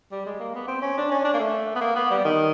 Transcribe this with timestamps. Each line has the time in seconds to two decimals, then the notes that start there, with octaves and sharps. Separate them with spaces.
0.11 G3
0.26 G#3
0.40 A#3
0.55 B3
0.68 C4
0.82 C#4
0.97 D4
1.11 C#4
1.24 D4
1.34 A#3
1.39 A3
1.75 B3
1.81 A#3
1.96 B3
2.10 G3
2.25 D#3